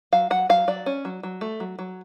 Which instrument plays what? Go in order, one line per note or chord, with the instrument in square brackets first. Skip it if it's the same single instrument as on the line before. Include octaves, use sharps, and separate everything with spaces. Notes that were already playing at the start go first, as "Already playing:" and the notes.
[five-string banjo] F#3 F5
F#3 F#5
F#3 F5
F#3 D5
C#4
F#3
F#3
A3
F#3
F#3